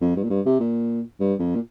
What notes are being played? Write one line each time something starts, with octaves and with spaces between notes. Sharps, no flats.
F2
G2
A#2
G2
C3
A#2
G2
F2
A#2